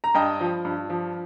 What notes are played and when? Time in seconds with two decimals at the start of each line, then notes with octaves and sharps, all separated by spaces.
0.04 A#5
0.14 G2 D#5 G5
0.41 F3
0.65 G2
0.90 F3